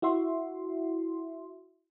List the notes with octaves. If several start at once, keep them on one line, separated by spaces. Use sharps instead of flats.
E4 F#4 E5 C6